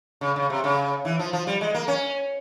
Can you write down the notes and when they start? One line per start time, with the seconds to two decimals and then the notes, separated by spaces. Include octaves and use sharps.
0.21 C#3
0.36 C#3
0.50 C3
0.64 C#3
1.05 E3
1.19 F3
1.33 F3
1.47 G3
1.61 G#3
1.74 A#3
1.88 C#4